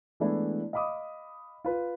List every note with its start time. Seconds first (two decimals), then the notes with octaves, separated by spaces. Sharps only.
0.20 E3 G#3 A3 B3 D4 E4
0.73 D#5 F5 B5 D6 D#6
1.65 F4 B4